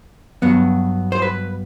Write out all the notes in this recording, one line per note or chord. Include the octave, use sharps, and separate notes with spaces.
G2 F#3 B3
C5
B4